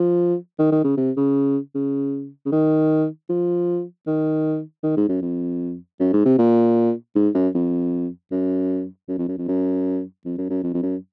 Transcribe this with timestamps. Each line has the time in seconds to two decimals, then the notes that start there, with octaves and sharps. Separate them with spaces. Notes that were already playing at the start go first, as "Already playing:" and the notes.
Already playing: F3
0.59 D#3
0.72 D#3
0.84 C#3
0.97 C3
1.17 C#3
1.75 C#3
2.46 C#3
2.52 D#3
3.30 F3
4.07 D#3
4.83 D#3
4.97 G#2
5.09 F#2
5.22 F2
6.00 F#2
6.13 G#2
6.25 C3
6.39 A#2
7.16 G#2
7.35 F#2
7.55 F2
8.32 F#2
9.08 F#2
9.18 F2
9.29 F#2
9.38 F2
9.48 F#2
10.25 F2
10.38 F#2
10.50 F#2
10.64 F2
10.74 F2
10.83 F#2